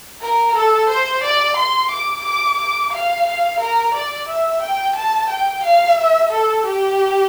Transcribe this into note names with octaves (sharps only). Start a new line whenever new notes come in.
A#4
A4
C5
D5
C6
D6
D6
D6
F5
F5
A#4
D5
E5
G5
A5
G5
F5
E5
A4
G4